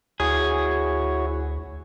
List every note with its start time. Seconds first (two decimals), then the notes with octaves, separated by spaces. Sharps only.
0.20 D2 E4 F#4 G#4 C#5